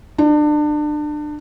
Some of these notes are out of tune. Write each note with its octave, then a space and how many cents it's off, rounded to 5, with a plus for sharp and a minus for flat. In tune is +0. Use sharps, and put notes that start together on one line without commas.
D4 +30